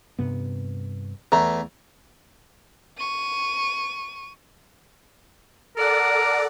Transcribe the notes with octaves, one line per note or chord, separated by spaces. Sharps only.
G2 C3 B3
E2 A3 A#5
C#6 D#7
A4 A#4 D5 F#5